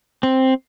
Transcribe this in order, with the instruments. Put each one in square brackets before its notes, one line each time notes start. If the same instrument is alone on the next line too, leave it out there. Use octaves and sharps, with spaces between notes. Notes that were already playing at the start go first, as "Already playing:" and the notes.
[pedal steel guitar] C4